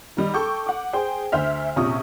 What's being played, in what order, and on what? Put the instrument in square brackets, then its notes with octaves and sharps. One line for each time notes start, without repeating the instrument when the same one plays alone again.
[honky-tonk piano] D#3 G3 D#4
A4 G5 C#6 D6 G6
F#5 D6
G#4 C5 G5
D2 C5 E5 F6
A#1 C3 C#4 F4 C#6 D#6